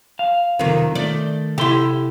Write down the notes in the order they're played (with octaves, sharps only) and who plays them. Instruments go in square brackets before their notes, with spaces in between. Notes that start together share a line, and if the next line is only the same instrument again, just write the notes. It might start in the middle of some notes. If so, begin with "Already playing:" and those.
[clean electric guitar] F5
[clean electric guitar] B1 C3 F4 [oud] F2 D#3
[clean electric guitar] D#3 A3 [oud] D5
[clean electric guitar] C3 A4 C6 [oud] E4 G4